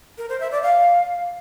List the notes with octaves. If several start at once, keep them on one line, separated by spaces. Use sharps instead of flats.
A#4
C5
E5
D5
F5